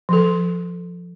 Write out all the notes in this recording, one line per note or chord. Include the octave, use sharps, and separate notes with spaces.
F3 A4